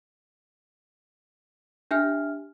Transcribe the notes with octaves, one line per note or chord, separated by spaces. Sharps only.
D4 G4 E5 G#5 F6